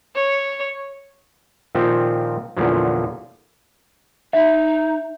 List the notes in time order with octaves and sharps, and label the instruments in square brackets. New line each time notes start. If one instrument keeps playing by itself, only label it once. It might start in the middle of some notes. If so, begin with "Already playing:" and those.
[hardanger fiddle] C#5
[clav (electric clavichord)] A#2 D#3 F3 C4 G4
E2 A#2 D3 F3 F#3
[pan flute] D#4 [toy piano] E5